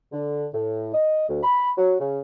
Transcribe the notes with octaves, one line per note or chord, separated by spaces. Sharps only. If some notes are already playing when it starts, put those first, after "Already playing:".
D3
A2
D#5
D2
B5
F#3
C#3